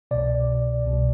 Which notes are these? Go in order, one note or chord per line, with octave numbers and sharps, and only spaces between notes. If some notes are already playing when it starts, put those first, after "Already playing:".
C2 B2 D5
C2 B2